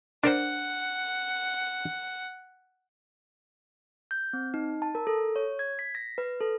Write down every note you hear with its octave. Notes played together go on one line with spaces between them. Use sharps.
D4 A#4 C5 F#5
G6
C4
D#4
A5
A#4
A4
C#5
G#6
B6
A#6
B4
A4